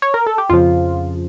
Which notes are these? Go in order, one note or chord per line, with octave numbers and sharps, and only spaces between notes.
C#5
A#4
A4
G4
F2 C#3 F3 F4